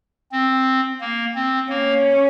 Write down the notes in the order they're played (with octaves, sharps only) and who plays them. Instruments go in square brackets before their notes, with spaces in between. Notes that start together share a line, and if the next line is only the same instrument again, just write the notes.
[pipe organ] C4
A#3
C4
[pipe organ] A#3 [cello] C#4